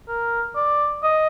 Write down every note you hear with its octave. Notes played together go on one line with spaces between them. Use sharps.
A#4
D5
D#5